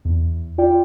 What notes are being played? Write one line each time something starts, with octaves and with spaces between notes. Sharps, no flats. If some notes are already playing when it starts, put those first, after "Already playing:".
E2
F4 D5 G5